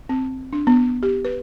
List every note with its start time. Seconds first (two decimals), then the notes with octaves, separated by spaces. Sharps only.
0.09 C4
0.53 D4
0.67 B3
1.03 G4
1.25 B4